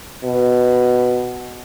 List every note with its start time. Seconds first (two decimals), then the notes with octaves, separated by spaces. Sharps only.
0.24 B2